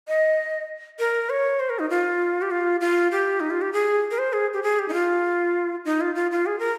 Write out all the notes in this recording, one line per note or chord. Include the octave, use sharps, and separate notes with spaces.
D#5
A#4
C#5
C5
A#4
D#4
F4
G4
F4
F4
G4
D#4
F4
G4
G#4
A#4
C5
G#4
G4
G#4
G4
D#4
F4
D#4
F4
F4
F4
G#4
A#4